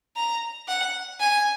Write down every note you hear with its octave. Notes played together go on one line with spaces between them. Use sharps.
A#5
F#5
G#5